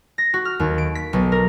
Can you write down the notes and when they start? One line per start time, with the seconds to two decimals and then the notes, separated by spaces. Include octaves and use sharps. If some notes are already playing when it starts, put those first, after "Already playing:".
0.18 A#6
0.34 F#4
0.45 F6
0.60 D#2
0.78 D7
0.95 B6
1.13 B1
1.32 A#4